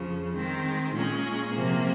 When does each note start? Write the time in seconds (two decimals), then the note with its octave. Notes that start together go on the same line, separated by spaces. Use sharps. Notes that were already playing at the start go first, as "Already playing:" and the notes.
Already playing: F2 C#3 F3
0.35 D#3 G#3 C4
0.93 A#2 G#3 C#4 G#4
1.52 C3 F3 A#3